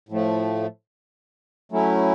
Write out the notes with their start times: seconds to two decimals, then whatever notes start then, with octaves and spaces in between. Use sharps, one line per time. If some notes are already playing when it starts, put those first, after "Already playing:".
0.09 A2 F3 A3
1.72 F#3 A3 C#4 E4